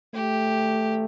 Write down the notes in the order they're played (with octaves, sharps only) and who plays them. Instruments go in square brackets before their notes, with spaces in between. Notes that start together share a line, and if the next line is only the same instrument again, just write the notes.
[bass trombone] A3 [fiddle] G4